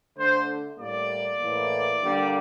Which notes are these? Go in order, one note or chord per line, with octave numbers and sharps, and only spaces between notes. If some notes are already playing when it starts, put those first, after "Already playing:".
D3 A3 C5
A2 G3 A#3 D5
A2 E3 A#3
D3 G3 A#3